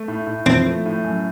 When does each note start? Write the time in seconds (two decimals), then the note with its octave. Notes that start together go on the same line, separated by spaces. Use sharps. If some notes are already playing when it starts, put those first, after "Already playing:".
Already playing: A3
0.08 A2
0.27 A2
0.46 F3 C4
0.66 A3
0.86 A2
1.04 F#2